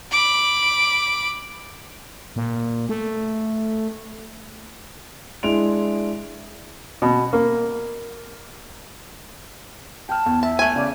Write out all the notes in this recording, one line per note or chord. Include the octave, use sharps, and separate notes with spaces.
B5 D6
A#2
A3
G#3 D4 E4 C6 D7 F7
B2
A#3
G5 A5 F6
E2
E5 A5
A3 G#5
C#3 D5